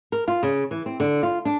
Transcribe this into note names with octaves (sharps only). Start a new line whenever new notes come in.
A#4
F4
C#3
E3
C4
D3
F4
D4